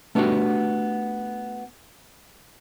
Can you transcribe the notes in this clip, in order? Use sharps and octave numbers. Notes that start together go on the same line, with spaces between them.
A3 B3 D4 D#4 F#4 G4